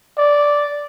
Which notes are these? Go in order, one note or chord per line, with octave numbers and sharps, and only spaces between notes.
D5